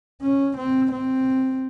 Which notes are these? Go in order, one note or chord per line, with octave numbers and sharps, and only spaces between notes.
C#4
C4
C4